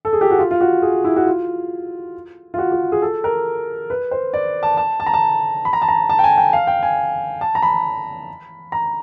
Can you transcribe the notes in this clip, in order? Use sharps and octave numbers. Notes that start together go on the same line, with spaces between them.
A4
G#4
G4
F#4
F4
F4
F#4
G#4
E4
F#4
F4
F4
F#4
F#4
G#4
A4
A#4
B4
C5
D5
A5
A5
A5
A#5
A5
B5
A#5
A5
A#5
A5
G5
G#5
G5
F5
G5
G#5
A5
A#5
B5
A#5